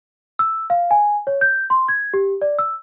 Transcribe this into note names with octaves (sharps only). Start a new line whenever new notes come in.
E6
F5
G#5
C#5
G6
C6
G#6
G4
D5
E6